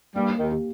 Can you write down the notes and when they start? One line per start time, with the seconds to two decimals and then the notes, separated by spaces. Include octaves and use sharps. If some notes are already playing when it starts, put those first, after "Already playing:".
0.15 G2 G3 A#3
0.38 D#2 D#3
0.50 G4